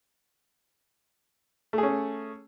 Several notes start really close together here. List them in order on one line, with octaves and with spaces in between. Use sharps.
A3 G#4 C#4